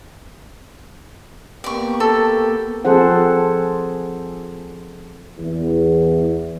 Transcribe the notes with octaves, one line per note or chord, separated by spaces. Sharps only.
A#3 B3 G4 D5 C#6
A4
F3 C4 G#4 A4 C5 F#5
E2